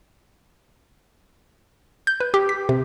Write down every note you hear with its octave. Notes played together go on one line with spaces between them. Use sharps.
G6
B4
G4
B6
C3